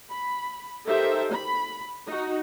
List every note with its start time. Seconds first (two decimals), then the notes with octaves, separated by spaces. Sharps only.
0.11 B5
0.86 D#4 G4 A4 A#4 C5 E5
1.32 B5
2.07 D#4 F#4